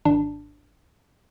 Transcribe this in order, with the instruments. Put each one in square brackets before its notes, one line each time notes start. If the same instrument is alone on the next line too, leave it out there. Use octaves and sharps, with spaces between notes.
[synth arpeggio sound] G#1 D4